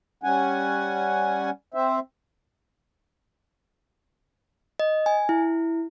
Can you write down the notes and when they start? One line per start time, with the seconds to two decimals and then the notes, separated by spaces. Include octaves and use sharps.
0.23 G3 C#4 F#5 G#5
1.74 C4 C5 E5
4.80 D#5
5.06 G#5
5.29 E4